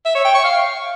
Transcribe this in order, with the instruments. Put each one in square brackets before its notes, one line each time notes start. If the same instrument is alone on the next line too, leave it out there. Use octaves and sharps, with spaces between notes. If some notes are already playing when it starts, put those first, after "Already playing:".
[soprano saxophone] E5
C#5
G5
C#6
F5